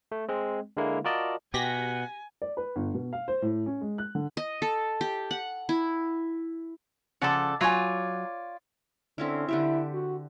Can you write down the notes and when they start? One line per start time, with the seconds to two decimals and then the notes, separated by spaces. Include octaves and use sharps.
0.12 A3
0.28 G#3 C4
0.77 D3 G#3 A#3 E4
1.04 F4 F#4 A#4 D5 D#5 A5
1.54 B2 G4 F#5 G#5 A#6 B6
2.42 D5
2.57 B4
2.76 G1
2.94 B2
3.13 F5
3.28 C5
3.42 A2
3.66 C#4
3.81 G#3
3.98 F#6
4.15 D3
4.37 D#5
4.62 A4
5.01 G4
5.31 F#5
5.69 E4
7.22 C#3 F3 A4 D5 F#5
7.61 F#3 F4 C#5 D5 G#5
9.18 D3 C4 C#4 E4
9.49 D3 E4 G4 E5
9.94 F#4